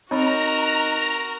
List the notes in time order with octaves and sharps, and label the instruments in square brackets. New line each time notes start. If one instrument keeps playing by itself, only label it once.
[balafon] C4 C#5 B5 [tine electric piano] D#4 [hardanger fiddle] F#4 A#4 [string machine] A#5